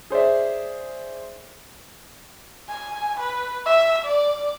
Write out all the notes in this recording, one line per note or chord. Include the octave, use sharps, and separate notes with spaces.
G#4 C5 D5 E5
G#5
B4
E5
D5